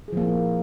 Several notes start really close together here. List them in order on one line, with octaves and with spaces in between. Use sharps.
G#4 F3 A#3 E4